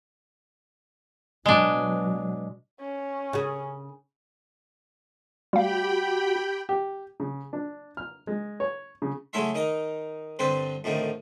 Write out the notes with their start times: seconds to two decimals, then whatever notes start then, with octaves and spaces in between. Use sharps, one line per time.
1.46 B2 F#3 G#3 D4
2.81 C#4
3.33 C#3 G#4
5.53 G3 A3 F#4 G4 F5 G5 B5
6.69 G4
7.20 C#3
7.53 D4
7.97 F6
8.27 G#3
8.60 C#5
9.02 C#3
9.33 C#3 F#3 A3 E4 E5 C6
9.55 D#3 D#4 D#5
10.39 G2 D3 C4 B4 C5
10.84 F2 A2 D3 D#3